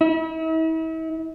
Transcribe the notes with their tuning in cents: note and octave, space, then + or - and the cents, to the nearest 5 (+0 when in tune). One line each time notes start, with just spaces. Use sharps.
E4 -40